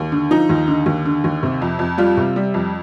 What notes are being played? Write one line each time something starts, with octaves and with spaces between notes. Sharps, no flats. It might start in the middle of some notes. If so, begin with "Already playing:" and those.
Already playing: D#2
D3
F3 D#4
D#2
D3
D#2
D3
D#2
C3
F2
F2
G3 F4
C3
G3
F2